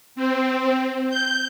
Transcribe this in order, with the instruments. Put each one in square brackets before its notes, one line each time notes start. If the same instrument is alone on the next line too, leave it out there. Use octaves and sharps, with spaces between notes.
[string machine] C4
G6